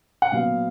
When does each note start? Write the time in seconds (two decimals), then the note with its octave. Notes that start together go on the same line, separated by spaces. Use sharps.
0.22 F#5
0.32 A#2 F#3 B3 F5